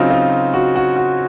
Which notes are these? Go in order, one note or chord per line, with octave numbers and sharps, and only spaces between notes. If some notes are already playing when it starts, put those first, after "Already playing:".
Already playing: C#3 F#3 C4 D#4 F4
F4
F#4
F#4
F#4